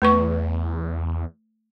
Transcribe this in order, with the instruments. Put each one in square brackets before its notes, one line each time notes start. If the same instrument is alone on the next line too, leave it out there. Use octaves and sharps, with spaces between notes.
[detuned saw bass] E2 [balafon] A3 B4 C#6